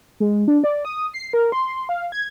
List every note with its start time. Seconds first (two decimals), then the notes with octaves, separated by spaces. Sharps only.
0.20 G#3
0.48 D4
0.64 D5
0.85 D#6
1.14 C7
1.33 A#4
1.52 C6
1.89 F5
2.12 G#6